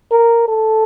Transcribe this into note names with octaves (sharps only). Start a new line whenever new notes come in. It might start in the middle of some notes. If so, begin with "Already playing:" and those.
A#4
A4